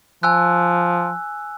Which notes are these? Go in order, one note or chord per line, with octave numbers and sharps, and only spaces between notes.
F3 G#5 E6 F#6